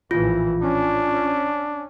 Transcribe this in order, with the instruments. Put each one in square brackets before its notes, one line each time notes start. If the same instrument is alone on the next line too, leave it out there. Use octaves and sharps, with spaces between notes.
[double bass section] A#1 A2 E3 [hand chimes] F4
[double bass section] C#4 [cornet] D4